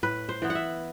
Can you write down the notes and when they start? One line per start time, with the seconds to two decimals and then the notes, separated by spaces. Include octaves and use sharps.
0.03 A2 B4
0.29 C5
0.42 E3 B3
0.50 F#5
0.55 E5